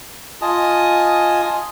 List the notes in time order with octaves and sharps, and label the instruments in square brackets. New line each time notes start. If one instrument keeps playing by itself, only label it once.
[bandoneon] F4 D#5 G#5 A5 D#6